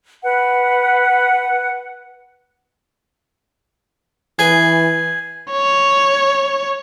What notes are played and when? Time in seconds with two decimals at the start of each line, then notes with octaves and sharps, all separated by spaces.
0.23 B4 F#5
4.39 E3 G#4 B4 G#5 G#6
5.51 C#5